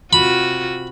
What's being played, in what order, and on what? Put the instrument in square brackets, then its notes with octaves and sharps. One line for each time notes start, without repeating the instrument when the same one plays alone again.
[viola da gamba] C3 F4 F#4 [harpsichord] B5